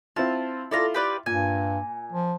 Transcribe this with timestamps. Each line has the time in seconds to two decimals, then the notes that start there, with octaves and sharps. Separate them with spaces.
0.16 C4 E4 F4 A5
0.71 E4 F4 A4 D5 A#5
0.94 G4 B4 D5
1.26 G2 A#2 G#5
2.12 F3